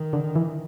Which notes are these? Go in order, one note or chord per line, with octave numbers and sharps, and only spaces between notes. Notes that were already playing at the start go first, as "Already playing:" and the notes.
Already playing: D#3
D3
E3